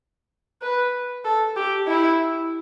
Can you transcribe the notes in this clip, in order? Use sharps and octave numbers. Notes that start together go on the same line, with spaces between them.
B4
A4
G4
E4